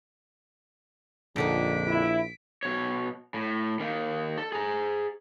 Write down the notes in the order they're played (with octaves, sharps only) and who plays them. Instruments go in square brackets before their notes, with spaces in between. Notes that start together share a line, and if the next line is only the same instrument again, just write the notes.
[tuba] A#1 [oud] F2 D3 D#4 [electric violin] B6 D7
[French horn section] E4
[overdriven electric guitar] B2 C#5
A2
D#3 A#3
A4
G#4 A#5